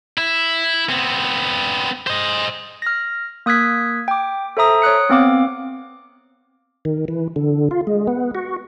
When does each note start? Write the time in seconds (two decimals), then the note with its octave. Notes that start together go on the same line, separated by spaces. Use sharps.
0.18 E4
0.89 B3 C4
2.07 C5 D#5
2.82 F6 A#6
3.46 A#3 D#6 F#6 G#6 B6
4.08 G5 D6
4.57 A4 C5 E5 A#5 D#6
4.82 C#5 D#6 F#6 C#7
5.09 B3 C4 F5 D6
6.85 D#3
7.08 E3
7.36 D3
7.71 F4
7.87 G#3
8.07 B3
8.35 F#4